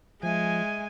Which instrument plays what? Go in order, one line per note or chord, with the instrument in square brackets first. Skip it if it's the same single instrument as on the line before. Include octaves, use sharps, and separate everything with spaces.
[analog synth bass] F3 [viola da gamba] G#3 [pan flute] E5 [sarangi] G#5